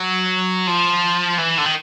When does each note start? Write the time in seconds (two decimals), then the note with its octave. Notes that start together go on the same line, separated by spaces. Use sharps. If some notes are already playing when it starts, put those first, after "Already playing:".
Already playing: F#3
0.67 F3
1.38 E3
1.57 D3
1.65 D#3